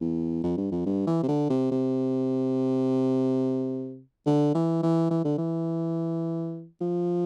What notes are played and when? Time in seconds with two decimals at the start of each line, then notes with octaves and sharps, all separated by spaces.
0.01 E2
0.44 F2
0.57 G2
0.72 F2
0.86 G2
1.07 E3
1.23 C3
1.28 D3
1.50 C3
1.71 C3
4.26 D3
4.55 E3
4.82 E3
5.11 E3
5.24 D3
5.38 E3
6.81 F3